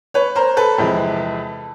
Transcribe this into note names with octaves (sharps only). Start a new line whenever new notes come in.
B4 C#5
A#4 C5
A4 B4
E2 C3 F3 G#3